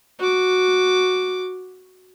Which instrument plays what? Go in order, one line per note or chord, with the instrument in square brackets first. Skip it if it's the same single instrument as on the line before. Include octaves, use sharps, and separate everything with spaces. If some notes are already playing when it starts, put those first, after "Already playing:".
[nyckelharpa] F#4 D6